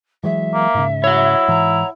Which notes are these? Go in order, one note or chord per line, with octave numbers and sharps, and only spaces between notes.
E3 F#3 G#3 E5
A#3
G#2 C#3
E4 C#5 F#5
G#2 E3 A#5